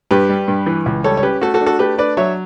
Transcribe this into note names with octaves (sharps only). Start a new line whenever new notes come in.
G2 G4 B4
G3
G2
E3
C#2
G3 A4 C#5
C#5
C#4 G4 B4
A3 F#4 A4
F#4 A4
D4
F#4 A4
A3 G4 B4
D4 B4 D5
F#3 C#5 E5